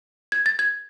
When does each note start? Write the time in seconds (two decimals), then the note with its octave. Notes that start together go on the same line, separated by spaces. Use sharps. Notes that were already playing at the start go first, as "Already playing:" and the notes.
0.32 G#6
0.46 A6
0.59 G#6